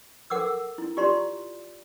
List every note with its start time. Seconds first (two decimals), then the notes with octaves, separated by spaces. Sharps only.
0.30 A4 A#4 F#5 D6 E6
0.78 E4
0.97 F4 G4 D5 A#5 C6